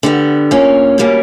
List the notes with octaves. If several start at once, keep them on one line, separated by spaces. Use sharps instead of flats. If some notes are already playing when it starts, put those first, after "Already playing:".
D3 G3 B3
A#2 A#3 C#4
B2 G3 A#3 C#4